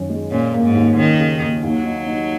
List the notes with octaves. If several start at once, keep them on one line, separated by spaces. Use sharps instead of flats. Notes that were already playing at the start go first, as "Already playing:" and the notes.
Already playing: F#2 D#3 C#4
G#3
A#2 C#4
A#3
G#2
D#2
D#3 C#4
C#3
D#2
D#2 F#3
D#4
D#4